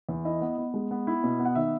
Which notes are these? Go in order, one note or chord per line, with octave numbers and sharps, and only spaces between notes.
E2
E4 D#5
B3
B3
G#3
B3
E4
B2
B3
F#5
D#3 E5